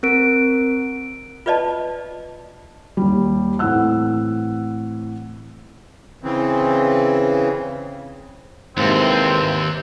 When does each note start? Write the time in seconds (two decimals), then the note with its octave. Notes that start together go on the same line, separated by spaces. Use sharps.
0.03 C4 A#4 D7
1.46 F4 B4 D5 D#5 A5
2.97 D#2 G3
3.59 A2 E3 C4 F#5 E6 F#6
6.23 C#3 E3 C4
8.77 D#2 G#2 C3 E3 A#3 C4